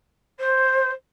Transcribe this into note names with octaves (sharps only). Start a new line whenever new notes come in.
C5